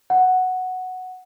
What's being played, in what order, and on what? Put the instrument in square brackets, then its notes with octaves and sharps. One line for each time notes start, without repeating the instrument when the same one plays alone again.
[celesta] F#5